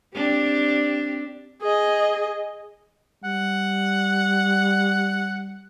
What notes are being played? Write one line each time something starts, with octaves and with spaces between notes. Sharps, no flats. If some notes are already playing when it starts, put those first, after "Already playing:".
C4 D4 G4
G#4 D#5
G3 F#5